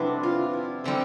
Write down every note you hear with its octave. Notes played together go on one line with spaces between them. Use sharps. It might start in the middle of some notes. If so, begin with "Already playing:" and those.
Already playing: F2 C3 G3 B3 D4 E4
F4
E4
D3 G3 C4